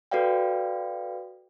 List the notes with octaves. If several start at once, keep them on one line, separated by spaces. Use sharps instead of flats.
F#4 A4 B4 D5 F5 G5